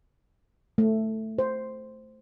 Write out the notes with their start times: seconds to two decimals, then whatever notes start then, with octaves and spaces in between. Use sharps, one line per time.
0.78 A3
1.39 C5